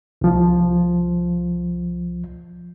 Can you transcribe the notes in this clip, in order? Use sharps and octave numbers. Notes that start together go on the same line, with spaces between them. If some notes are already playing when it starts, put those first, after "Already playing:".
C2 F3